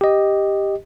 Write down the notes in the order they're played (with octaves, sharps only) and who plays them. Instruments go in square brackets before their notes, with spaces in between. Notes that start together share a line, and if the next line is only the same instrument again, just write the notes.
[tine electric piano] G4 D#5